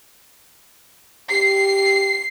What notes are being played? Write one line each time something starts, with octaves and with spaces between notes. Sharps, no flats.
G4 C7